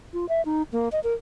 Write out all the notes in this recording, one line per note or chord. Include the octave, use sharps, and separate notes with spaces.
F4
E5
D#4
A#3
D#5
A#4